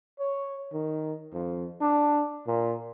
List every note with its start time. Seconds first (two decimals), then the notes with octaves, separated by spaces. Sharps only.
0.19 C#5
0.73 D#3
1.33 F2
1.81 D4
2.47 A#2